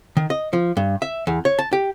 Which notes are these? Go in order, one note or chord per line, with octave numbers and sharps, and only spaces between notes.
D#3
D#5
F3
G2
E5
E2
C#5
A5
G4